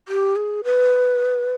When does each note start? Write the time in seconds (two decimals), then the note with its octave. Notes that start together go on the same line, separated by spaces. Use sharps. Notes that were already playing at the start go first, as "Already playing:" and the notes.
0.08 G4
0.36 G#4
0.64 B4